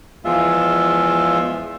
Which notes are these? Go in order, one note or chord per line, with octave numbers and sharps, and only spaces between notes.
E2 F3 G#3 F4 E5